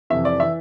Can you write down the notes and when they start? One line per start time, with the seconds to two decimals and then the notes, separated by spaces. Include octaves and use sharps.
0.10 F2 C3 E3 E5
0.25 D5
0.40 E3 E5